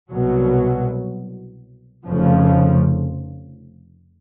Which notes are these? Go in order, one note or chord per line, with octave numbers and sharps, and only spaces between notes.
C2 B2 F#3
F1 F2 C#3 F3